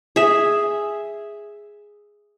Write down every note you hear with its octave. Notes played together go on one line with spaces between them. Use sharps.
G#4 E5